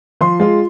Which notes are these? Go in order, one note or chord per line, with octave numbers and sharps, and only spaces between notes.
F3 C6
G#3 F4